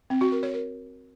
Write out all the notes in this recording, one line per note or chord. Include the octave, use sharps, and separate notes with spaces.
C4
F#4
A#4
C#5
A#4